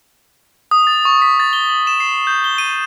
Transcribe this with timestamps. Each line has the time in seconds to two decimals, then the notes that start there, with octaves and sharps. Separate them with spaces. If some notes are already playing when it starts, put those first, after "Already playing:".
0.71 D#6
0.87 A6
1.05 C#6
1.22 B6
1.40 A6
1.53 G7
1.69 F#7
1.87 E7
2.00 C7
2.27 G6
2.44 G7
2.58 D#7